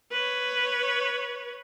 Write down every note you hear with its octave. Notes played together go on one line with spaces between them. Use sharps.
B4 C#5